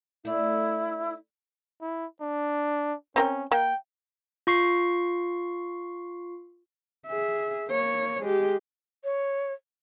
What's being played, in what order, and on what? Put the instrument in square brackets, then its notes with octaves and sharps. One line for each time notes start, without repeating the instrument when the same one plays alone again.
[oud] A3 D4 [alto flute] E4
[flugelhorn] E4
D4
[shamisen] C4 A#4 G5 [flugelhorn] C#4
[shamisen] A#3 [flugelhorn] G5
[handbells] F4 C#6 C7
[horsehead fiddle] G#4 E5
A#3 C#5
G#3 G4
[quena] C#5